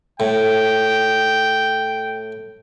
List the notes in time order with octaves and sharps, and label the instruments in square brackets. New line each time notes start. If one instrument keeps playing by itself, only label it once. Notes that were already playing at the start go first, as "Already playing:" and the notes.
[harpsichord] A2 [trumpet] G5